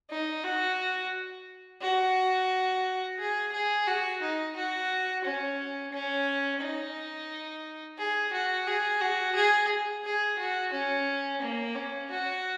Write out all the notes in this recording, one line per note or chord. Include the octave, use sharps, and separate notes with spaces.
D#4
F#4
F#4
G#4
G#4
F#4
D#4
F#4
C#4
C#4
D#4
G#4
F#4
G#4
F#4
G#4
G#4
F#4
C#4
A#3
C#4
F#4